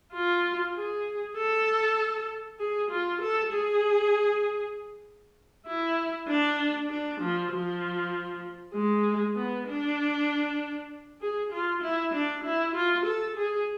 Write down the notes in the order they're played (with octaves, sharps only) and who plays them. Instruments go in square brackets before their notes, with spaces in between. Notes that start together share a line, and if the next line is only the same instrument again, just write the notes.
[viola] F4
G#4
A4
G#4
F4
A4
G#4
E4
D4
D4
F3
F3
G#3
B3
D4
G#4
F4
E4
D4
E4
F4
A4
G#4